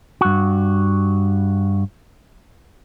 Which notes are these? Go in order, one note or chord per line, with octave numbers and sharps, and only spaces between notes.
G2 F#4